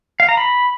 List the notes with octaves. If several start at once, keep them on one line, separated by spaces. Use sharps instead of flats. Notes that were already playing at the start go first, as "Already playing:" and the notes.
F5
A#5
B5